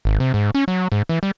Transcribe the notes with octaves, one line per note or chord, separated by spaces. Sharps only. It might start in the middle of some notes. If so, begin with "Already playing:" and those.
G#1
C3
G#2
C#4
F#3
G#2
E3
G3